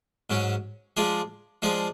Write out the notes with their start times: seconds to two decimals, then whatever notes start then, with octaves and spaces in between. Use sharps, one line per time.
0.30 G#2 F#3 C#4
0.97 F3 G#3 D4 G#4
1.62 F3 G#3 D4 G#4